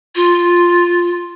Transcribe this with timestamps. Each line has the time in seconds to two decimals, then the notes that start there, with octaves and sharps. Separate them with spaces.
0.15 F4